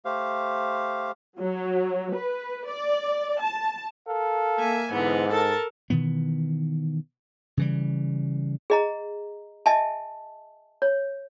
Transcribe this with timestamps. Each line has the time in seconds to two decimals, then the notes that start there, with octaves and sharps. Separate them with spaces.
0.05 A3 G4 C5 F5
1.39 F#3
2.13 B4
2.67 D5
3.40 A5
4.08 A4 A#4 F5
4.59 A#3 E5 G#5
4.92 G#2 D3 E3 B3
5.31 A4 A#4 A5
5.90 B2 D#3 E3 B3
7.57 C#3 E3 G3
8.70 G#4 D#5 A#5
9.66 D#5 E5 G#5 A5
10.82 C#5